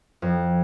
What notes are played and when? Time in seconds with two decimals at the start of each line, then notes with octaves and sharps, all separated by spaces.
0.22 F2